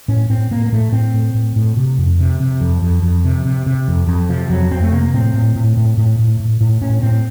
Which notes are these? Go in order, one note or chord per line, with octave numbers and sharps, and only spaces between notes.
A2 C#4
A2 C4
A2 A#3
A#3
A2 A3
A2 C4
A2
A2
A2
C3
F2
C3
C3
F2
F2
F2
C3
C3
C3
F2
F2
C3 F3
F2 F#3
F2 C4
A3
C3 A#3
A2 C4
A2
A2
A2
A2
A2
A2
A2
A2 C#4
A2 C4